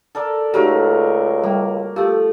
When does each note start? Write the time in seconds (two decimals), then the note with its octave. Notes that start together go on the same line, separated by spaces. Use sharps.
0.15 A4 A#4 D5
0.54 C#2 F#3 A3 D#4 F#4 G4 A#4
1.43 G3 A#3 G5
1.96 F3 A3 G4 F5